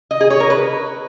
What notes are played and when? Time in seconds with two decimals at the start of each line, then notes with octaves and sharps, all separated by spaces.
0.11 D#5
0.21 G#4
0.30 C#5
0.40 A#4
0.50 B4